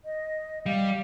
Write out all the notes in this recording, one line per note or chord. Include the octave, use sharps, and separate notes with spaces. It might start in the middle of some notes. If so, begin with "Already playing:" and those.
D#5
G3 F5